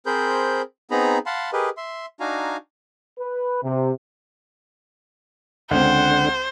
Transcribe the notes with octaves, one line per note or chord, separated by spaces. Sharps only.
C4 G#4 A#4 C5 B5 G6
B3 C4 D#4 G#4 A#5 B5
F5 F#5 A5 B5 C6
G4 G#4 A#4 B4 D#5
E5 C6
D4 D#4 F#4 F5 G#5 A#5
B4
C3
C#2 D3 C4 C5 F#5